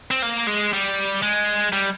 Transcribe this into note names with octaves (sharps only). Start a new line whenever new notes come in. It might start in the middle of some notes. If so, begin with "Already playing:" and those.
C4
A#3
G#3
G3
G#3
G3